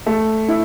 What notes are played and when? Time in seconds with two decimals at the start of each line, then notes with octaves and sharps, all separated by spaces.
0.06 A3
0.48 E4